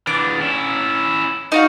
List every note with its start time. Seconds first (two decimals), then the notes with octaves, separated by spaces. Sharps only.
0.07 E3 D4 D6
0.40 C#4 E4
1.52 D#4 F#4 F5